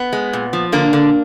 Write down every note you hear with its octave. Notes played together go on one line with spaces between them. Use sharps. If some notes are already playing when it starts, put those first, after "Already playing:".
Already playing: B3
G#3
A#2
F3
D3 A#3 D4
D3